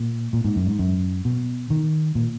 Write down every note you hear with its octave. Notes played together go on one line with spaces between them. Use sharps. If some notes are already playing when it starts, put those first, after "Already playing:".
Already playing: A#2
A#2
G#2
F#2
G#2
F#2
B2
D#3
A#2